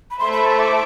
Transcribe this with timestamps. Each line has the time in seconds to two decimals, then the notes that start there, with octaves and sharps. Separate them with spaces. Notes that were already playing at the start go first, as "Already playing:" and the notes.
0.11 B5
0.19 A3 E4 A4 C5 E5 C6
0.33 B5
0.46 A5
0.59 D6